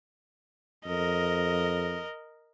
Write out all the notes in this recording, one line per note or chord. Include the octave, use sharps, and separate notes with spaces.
F2 A#4 D#5